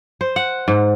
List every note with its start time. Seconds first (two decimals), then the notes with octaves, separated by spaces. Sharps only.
0.21 C5
0.36 F#5
0.68 G#2